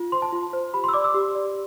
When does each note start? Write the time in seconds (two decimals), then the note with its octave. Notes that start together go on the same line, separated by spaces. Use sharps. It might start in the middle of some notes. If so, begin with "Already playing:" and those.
Already playing: F4
0.12 C5 C6
0.22 A5
0.33 F4
0.53 C5
0.74 G4 B5
0.84 C6
0.89 E6
0.93 D5 D6
1.04 E6
1.14 G4
1.35 D5